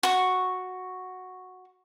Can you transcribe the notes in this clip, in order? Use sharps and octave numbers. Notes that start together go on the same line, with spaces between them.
F#4 C#6